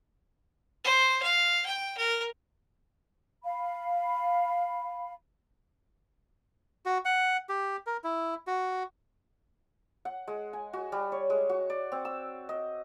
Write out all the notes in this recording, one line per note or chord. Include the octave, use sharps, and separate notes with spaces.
C5
F5
G5
A#4
F5 B5
F#4
F#5
G4
A#4
E4
F#4
F#5
G#3
G#5
F#4
G3
C#5
G#3
F#4
D5
C4
E6
D#5